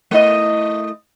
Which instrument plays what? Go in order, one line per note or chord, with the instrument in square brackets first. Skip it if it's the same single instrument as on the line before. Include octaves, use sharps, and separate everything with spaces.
[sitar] A3 E4 D#5